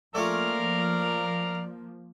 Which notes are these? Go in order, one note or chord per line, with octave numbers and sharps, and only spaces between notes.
F3 A3 A#3 C#4 F4 A#4 D5 F5